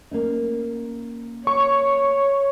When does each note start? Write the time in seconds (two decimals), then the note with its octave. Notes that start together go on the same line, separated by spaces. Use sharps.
0.11 A#3 C#4 D#4
1.47 C#5 C#6